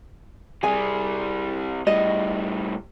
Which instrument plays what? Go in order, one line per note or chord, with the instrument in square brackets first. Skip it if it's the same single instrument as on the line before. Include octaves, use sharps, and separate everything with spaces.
[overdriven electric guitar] C3 G3 [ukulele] G#4 G#5
[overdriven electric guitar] A2 G3 [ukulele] D#5